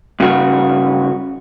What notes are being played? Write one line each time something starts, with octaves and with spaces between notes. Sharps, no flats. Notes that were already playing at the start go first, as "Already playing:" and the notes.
G2 C#3 F#4